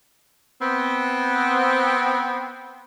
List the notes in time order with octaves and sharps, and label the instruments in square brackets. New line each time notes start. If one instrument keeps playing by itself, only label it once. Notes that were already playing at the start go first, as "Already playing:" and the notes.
[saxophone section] B3 C4